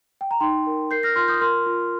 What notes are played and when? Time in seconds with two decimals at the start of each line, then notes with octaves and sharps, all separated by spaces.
0.21 G5
0.31 A#5
0.40 D#4 G5 C6
0.67 A#4
0.91 A#4 G6 C7
1.03 F6 A#6
1.16 F4 C6 F6
1.28 D#6 G6
1.41 A#4 C6 F6
1.66 F4